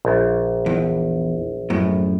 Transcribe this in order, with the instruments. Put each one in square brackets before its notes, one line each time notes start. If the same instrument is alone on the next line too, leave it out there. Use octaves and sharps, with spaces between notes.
[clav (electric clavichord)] A#1
[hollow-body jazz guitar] E2
F#2 A2